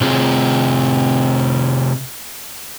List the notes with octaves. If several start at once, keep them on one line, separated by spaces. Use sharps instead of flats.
C3 C4 F4 G#4